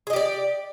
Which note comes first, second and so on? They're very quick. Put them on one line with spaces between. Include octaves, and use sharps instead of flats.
G#4 D#5 G4 D5